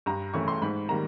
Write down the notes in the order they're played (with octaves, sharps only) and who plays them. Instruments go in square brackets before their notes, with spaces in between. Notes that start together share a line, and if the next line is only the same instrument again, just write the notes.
[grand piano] G2 A#5
E3 A3 C#4 E4 C#6
C6
G#2 B5
D#3 G3 A#3 A#5